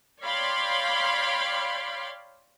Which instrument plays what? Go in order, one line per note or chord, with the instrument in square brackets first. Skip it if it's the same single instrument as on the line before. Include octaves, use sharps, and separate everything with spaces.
[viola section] C#5 D5 F5 G5 B5 C6